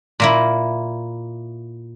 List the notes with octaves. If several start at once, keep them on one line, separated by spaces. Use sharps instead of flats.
A#2 A#3 E4